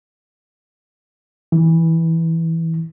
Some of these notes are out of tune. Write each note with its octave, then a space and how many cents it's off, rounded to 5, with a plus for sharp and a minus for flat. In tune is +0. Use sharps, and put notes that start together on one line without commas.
E3 -10